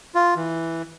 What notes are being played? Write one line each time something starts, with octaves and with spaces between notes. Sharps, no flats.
F4
E3